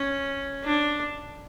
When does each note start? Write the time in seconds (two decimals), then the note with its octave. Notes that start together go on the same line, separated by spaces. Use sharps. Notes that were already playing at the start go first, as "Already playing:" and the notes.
Already playing: C#4
0.64 D4